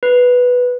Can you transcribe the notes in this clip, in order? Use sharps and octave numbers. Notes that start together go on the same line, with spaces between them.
B4